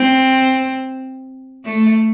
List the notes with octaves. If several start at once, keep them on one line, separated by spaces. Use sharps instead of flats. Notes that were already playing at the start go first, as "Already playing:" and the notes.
Already playing: C4
A3